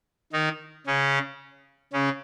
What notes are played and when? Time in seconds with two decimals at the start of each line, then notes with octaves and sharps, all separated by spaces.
0.33 D#3 D#4
0.87 C#3 C#4
1.93 C#3 C#4